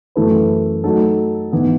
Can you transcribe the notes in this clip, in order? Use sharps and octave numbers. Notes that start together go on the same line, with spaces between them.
F#2 E3 A3 E4 B4
F#3 A3 D#4 A4
G#2 E3 B3 E4